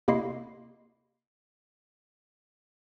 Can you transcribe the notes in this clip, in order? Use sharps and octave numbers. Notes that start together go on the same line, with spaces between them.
C3 A#3 E4 D#5 C6 C7